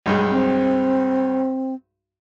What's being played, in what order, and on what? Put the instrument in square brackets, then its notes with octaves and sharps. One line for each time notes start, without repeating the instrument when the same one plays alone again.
[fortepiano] B1 G2 G#3
[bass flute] C4